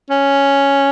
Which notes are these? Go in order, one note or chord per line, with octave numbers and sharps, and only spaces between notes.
C#4